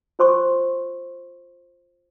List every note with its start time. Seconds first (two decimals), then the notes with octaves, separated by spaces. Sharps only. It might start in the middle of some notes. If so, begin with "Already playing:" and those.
0.19 F4 C5 C6 C#6